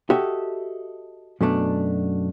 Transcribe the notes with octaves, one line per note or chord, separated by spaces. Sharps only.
F#4 G4 A4 D#5 E5
F#2 B2 A3 D4